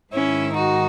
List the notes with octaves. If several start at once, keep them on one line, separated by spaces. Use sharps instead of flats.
G#2 D#3 C#4 E4
D#4 F#4